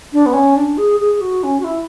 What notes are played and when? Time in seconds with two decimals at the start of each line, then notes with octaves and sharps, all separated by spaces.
0.13 D4
0.26 B3
0.34 C#4
0.56 D4
0.78 G#4
1.00 G#4
1.21 F#4
1.43 C#4
1.60 F#4
1.64 E4